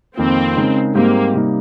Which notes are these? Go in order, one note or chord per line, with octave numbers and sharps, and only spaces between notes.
F2 D#3 A#3 C4 F4
C#3 G#3 D#4 A#4
G#2 G3 A#3 C4 G4
C3 G3 A#3 D#4